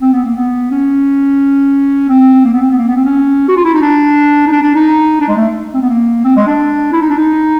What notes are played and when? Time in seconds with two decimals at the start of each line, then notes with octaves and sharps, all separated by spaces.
0.01 C4
0.12 B3
0.25 A#3
0.36 B3
0.71 C#4
2.09 C4
2.44 A#3
2.53 B3
2.61 C4
2.70 B3
2.78 A#3
2.87 B3
2.95 C4
3.05 C#4
3.48 F#4
3.57 F4
3.65 E4
3.73 D#4
3.82 D4
4.47 D#4
4.52 D4
4.62 D4
4.75 D#4
5.21 D4
5.28 G#3
5.37 A3
5.73 C4
5.81 B3
5.89 A#3
6.24 C4
6.36 G#3
6.47 D4
6.92 E4
7.02 D#4
7.10 D4
7.17 D#4